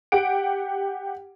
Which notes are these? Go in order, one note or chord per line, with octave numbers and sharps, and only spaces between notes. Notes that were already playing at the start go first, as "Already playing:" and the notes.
G4 F#5 D7